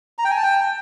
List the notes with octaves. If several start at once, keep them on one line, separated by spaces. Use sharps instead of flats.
A#5
G5
G#5
A5
G5